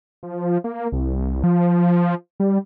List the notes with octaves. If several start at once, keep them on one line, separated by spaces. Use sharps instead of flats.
F3
A#3
C2
F3
G3